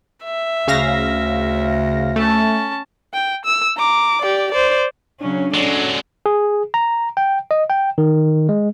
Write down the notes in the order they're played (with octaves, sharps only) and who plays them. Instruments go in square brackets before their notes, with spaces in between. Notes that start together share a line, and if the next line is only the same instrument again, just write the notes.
[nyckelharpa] E5
[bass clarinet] D2 [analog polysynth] C#3 F5 A#6
[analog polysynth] A3 [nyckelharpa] C#4 A5
[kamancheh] G5
E6
A#5 D6
G4 D5
C5 D5
[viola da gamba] C#3 F#3 C#4 [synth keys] D4
[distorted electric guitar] F#3 G#3 [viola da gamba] C#4 A4 D5
[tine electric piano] G#4
A#5
G5
D#5
G5
D#3
G#3